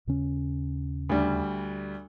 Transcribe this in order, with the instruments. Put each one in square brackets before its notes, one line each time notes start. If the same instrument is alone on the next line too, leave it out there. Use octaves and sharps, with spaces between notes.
[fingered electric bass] D#2 C#3 C#4
[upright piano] D2 G3